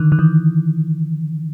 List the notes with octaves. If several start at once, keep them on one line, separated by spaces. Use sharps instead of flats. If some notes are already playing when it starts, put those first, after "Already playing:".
Already playing: D3 D#3
D#3
E3